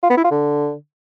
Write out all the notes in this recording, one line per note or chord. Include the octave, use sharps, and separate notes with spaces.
F4
B3
E4
F4
D3